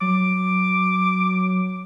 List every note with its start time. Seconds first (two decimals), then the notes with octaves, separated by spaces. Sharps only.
0.01 F#3 D6